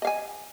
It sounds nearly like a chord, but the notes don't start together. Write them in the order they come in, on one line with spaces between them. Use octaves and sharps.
D#5 F5 G#5